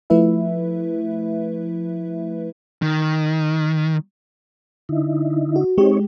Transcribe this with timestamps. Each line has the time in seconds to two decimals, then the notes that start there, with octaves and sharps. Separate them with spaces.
0.10 F3 A3 E4 B4 E5
2.82 D#3
4.89 D3 D#4 E4
5.56 F#4
5.78 G#3 C4 D#4 G4 C#5